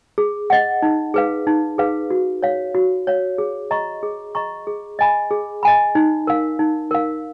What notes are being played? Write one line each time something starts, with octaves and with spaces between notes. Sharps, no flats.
G#4
D#5 F#5
D#4
G#4 B4 F5
D#4
G#4 B4 F5
F#4
C#5 F5
F#4
C#5 F5
G#4
D#5 A#5 C#6
G#4
D#5 A#5 C#6
G#4
D#5 G#5 B5
G#4
D#5 G#5 B5
D#4
A#4 F5
D#4
A#4 F5